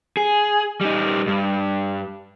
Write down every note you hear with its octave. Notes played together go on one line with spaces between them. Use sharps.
G#4
G3 D#4
G2